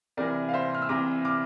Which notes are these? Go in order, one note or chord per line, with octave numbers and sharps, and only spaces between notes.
C2 C3 E3 A#4 D5
F5
C5 E5
F6
E6
C2 C3 E3 A#5 D6
D6 F6